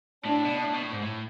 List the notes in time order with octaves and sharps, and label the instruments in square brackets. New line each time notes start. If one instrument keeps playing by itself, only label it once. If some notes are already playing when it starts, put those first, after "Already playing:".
[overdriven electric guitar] A2 [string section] D4
[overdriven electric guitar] B2
A2
B2
A2
G#2
A2